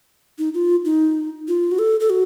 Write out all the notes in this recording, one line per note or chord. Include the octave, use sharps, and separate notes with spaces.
D#4
F4
D#4
F4
F#4
A4
A4
F#4